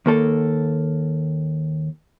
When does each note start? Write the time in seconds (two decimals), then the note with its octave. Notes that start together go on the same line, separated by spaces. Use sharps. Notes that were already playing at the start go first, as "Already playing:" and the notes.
0.06 D#2 A#3 A4